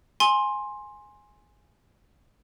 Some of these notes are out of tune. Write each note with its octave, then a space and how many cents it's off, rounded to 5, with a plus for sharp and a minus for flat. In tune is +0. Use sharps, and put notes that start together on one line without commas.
G#5 +0 C6 +15